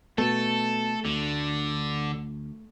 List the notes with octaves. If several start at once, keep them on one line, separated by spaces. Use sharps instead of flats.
B2 A3 A4
D2 D3